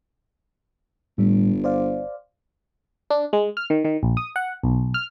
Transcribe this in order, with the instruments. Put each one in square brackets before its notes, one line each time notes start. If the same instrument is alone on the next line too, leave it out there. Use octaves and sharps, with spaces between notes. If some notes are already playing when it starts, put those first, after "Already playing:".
[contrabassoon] G1 [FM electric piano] A2 G3
[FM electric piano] C5 D5 F5
D4
G#3
F6
D#3
D#3
A#1
D#6
F#5
B1
F6